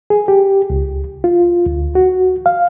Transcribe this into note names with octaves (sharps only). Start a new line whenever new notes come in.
G#4
G4
C#2
F4
D2
F#4
F5